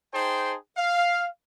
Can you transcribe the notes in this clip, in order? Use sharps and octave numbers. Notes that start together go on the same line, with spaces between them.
D#4 G#4 C5 G5 A5 C6
F5